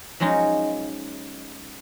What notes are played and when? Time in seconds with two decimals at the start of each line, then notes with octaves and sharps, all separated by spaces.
0.20 F3 F#3 G#3 C#4 D#4